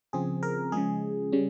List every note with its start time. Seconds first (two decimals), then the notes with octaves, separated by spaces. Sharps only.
0.13 C#3 F3 C4 G#4
0.43 A#4
0.72 C#3 F3 G#3 G#4
1.32 C#3 G3 C#4